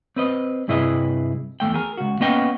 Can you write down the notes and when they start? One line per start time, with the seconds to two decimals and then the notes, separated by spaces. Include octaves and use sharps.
0.16 C4 B4 D#5
0.68 G2 C3 E4 G#4 B4 D#5
1.60 E2 C3 A3 G5
1.74 G#4 A#4
1.98 C#2 F#4
2.20 A#3 B3 C#4 D#5 G5